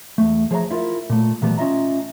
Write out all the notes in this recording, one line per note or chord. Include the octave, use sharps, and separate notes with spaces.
E2 A3
F3 G#4 C#5 E5 A#5
E4 F4 A#4 E5
A#2 A3
A#2 E3 F#3 G3 A3 B3
C#4 F4 D#5 E5 A#5